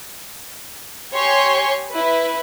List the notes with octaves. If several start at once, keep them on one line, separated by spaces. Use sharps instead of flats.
G4 C#5 G#5 C6 C#6
E4 B4